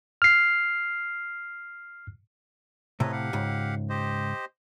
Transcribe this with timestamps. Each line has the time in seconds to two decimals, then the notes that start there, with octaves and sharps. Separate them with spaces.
0.22 F6 C7
3.00 A2 C3 B4 C#5 D#5
3.12 G4 F5 F#5
3.33 C#2 G#2
3.89 G4 C5 D#5